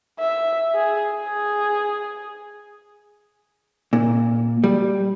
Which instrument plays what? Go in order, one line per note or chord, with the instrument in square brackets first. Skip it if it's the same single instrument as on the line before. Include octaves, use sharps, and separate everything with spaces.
[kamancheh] E5
G#4
G#4
[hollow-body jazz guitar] A#2
G3